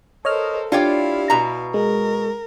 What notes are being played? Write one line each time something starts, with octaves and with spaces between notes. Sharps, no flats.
A4 A#4 C5 C#5 D#5 F6
D4 E4 F4 G4 C#5 D5 F5
B2 A#5
G#3 A#4